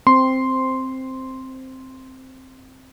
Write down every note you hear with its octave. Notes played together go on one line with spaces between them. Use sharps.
C4 C6